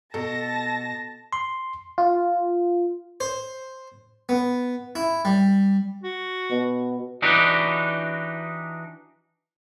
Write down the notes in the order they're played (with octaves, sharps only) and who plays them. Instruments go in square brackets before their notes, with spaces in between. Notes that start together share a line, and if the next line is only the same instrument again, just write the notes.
[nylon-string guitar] B2 [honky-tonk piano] A4 [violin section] A5 A#6
[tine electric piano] C6
[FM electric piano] F4
[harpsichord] C5
B3
E4
G3
[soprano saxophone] F#4
[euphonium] B2
[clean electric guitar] E3 D4 D#4 F#4 G4